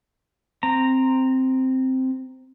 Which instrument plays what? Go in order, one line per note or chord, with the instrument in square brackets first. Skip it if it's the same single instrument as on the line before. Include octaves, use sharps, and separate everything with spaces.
[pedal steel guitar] C4 A#5